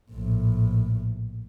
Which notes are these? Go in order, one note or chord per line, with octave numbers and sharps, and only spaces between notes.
A#1 A2